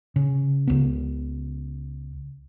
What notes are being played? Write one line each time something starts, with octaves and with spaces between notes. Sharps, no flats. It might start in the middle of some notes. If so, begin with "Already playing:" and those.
C#3
C#2 B3